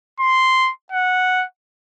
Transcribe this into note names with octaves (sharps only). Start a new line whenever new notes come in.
C6
F#5